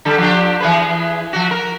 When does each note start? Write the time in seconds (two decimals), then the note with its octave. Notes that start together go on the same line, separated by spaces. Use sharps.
0.05 D3 G3 A4
0.18 F3 D4 G4
0.60 E3 G#4 B4
1.33 F3 F#4
1.51 A#4